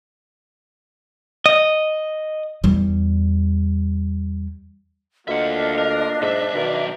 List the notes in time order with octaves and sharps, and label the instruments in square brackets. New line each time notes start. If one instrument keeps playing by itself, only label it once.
[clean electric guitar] D#5
[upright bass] E2 G3
[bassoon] D2 [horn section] A#3 F4 [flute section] D4 D#5 [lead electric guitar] E5 F#5
[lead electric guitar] A#4
[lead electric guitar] B1 E5 [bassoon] G#2
[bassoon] B2 [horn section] D#3 A#4 D5